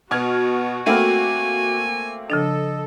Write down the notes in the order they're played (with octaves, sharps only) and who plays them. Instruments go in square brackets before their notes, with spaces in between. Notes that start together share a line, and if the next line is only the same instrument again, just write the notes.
[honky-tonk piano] B2 F6 G#6 [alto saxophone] B3 [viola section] F#4
[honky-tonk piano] A3 A#3 C4 [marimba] F#5 B5 F6 [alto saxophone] G#5
[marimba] C#3 F3 D4 [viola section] A4 [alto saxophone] D#5